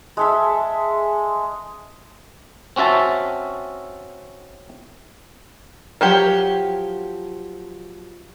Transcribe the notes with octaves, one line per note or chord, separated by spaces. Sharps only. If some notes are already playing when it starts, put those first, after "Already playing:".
G#3 A4 E5
C4 C#4 F#4 E5 A5
F3 F#3 G4